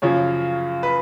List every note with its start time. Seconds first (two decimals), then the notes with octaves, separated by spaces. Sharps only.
0.02 F#2 C#3 F3 C#5
0.83 B4